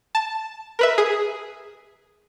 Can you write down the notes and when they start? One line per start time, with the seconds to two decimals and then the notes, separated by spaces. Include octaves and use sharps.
0.15 A5
0.79 A#4 B4 E5
0.98 G#4